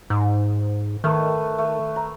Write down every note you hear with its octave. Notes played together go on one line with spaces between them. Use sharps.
G#2
D#3 A3 B4
A3
A#5